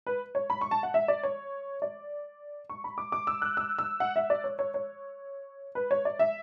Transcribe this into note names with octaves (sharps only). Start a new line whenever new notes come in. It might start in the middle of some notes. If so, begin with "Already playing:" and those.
B4
C#5
B5
C#6
A5
F#5
E5
D5
C#5
D5
C#6
B5
D6
D6
E6
F#6
E6
E6
F#5
E5
D5
C#5
C#5
C#5
B4
C#5
D5
E5